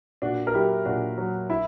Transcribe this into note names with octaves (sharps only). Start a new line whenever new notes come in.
A#2 D4 F#4
A#4
F#3 E4 G4
A#2 D4 F#4
F#3
E4